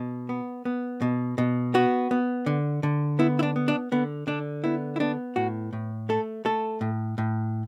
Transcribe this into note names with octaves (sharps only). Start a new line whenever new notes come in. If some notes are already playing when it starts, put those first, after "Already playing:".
Already playing: B2
B3
B3
B2
B2
B3 F#4
B3
D3
D3
B3 E4
E4
D4
B3
D4
D3 B3
D3 D4
B3 E4
E4
B3 D4
A2 F#4
A2
A3 A4
A3 A4
A2
A2